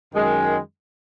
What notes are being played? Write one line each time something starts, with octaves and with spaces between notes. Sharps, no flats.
F#2 D#3 G#3